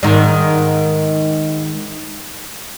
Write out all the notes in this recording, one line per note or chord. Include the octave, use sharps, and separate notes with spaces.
G#2 D#3